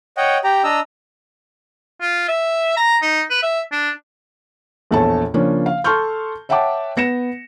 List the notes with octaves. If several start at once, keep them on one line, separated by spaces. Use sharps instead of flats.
C#5 D#5 F#5 G5
G4 G5 A#5
D4 D#5 A#5 E6
F4
E5
A#5
D#4
B4
E5
D4
A#1 E2 A4 C#5 A5
C#3 F3 A#3 C#4 D4
F5
A4 A5 C6 C#6 F6 G6
C#5 E5 F#5 G5 A5 D6
B3 A#6 C#7 E7